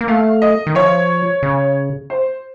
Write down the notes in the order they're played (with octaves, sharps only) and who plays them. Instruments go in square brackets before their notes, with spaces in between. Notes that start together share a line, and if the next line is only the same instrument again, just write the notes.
[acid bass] A#3
[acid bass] A3 [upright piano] F5
[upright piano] D#5
[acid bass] D#3
[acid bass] F3 [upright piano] C#5
[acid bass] C#3
[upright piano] C5